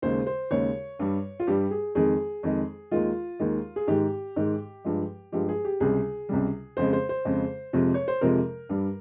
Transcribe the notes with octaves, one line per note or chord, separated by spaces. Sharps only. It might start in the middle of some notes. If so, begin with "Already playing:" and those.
D#2 C#3 G#3 C5
C5
D#2 C#3 G#3 C#5
G2 G3
F4
G2 G3 G4
G#4
F2 D#3 G#3 G#4
F2 D#3 G#3
D#2 D#3 G#3 F4
D#2 D#3 G#3
G#4
G#2 D#3 G#3 G4
G#2 D#3 G#3
G2 F3 G#3
G2 F3 G#3 G4
G#4
G4
C#2 C3 G3 G#4
C#2 C3 G3
F2 C#3 G#3 C5
C5
C5
F2 C#3 G#3
F2 C3 F3 G#3
C#5
C5
F2 C3 F3 G#3 A#4
G2 G3